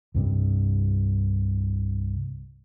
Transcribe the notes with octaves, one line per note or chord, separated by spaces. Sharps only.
C2 G2 C3